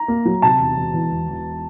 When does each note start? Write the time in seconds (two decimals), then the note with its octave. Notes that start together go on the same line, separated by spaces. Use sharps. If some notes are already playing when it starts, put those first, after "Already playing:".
Already playing: A#5
0.08 A#3
0.25 F#3
0.42 C3 A5
0.59 E1
0.77 E1
0.94 E2
1.11 E1
1.29 E1